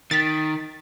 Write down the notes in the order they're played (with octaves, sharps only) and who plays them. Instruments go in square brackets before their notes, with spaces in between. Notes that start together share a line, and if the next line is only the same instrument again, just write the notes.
[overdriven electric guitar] D#3 [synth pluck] A6 B6